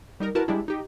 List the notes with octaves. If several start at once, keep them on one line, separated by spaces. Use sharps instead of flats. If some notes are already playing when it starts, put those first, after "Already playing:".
G3 D#4 A#4
E4 F#4 A#4 B4 A5
G3 G#3 D4 E4
D#4 G4